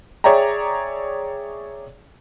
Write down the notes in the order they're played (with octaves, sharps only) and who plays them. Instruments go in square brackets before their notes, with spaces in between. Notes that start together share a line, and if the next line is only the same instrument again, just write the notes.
[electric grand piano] G#4 C#5 D5 E5 G5 A#5